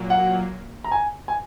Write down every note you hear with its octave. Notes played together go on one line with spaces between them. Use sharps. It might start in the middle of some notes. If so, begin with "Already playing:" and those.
Already playing: A#2 F#3 A#3
F#5
A#5
G#5
G#5